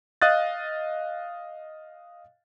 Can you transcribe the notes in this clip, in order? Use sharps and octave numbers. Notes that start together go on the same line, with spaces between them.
D#5 F5 D#6 F#6 A6